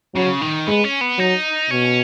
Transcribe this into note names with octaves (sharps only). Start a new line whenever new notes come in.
C#3 F#3
D#3
G#3 B3
C#4
B3
F#3 D#4
B2 C#4